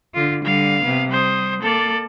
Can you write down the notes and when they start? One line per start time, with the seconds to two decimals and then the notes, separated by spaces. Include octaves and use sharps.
0.14 D3 F4
0.45 D3 G3 F5
0.82 C3 B3
1.11 G3 C5 D#6
1.62 A#3 A4 D5